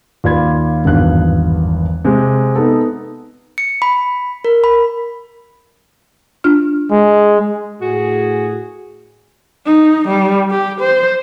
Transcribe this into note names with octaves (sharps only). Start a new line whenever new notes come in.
D#2 F4 D5 B5 G#6
G#1 E2 G2 B3 F5 F#6
C3 G#3
B3 D#4 A4
C#7
B5
A#4
B5
D4 F4 F6
G#3
A2 F#4 G#4
D#4
G3
G4
C5